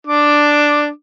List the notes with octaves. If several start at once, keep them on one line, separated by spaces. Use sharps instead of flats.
D4 D6